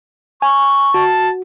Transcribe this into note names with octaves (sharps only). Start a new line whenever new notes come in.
G#5 C#6
F#4 A5